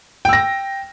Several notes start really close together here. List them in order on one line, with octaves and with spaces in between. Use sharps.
G5 E6 A#6